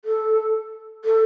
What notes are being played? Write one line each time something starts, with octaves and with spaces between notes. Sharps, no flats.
A4
A4